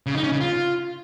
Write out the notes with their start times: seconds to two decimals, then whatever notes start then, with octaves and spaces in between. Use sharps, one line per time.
0.06 C#3
0.15 D#4
0.23 C#4
0.32 C#3
0.40 F4